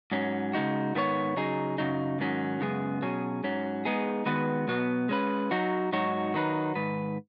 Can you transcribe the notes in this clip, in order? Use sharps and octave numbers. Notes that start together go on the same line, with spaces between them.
G#2 F#3 C#4
C#3 G#3 D#4 F#4
G#2 D#3 B3 G#4 C#5
C#3 F#3 D#4 G#4
F#2 C#3 F#3 D#4
G#2 D#3 F#3 C#4
F#2 C#3 G#3 B3 G#4
B2 F#3 C#4 G#4
G#2 F#3 C#4
G#3 B3 D#4 G#4
D#3 G#3 B3 F#4 B4
B2 F#3 B3
G#3 C#4 B4
F#3 D#4 F#4
G#2 F#3 D#4 F#4 C#5
D#3 F#3 D#4 B4
G#2 D#3 B4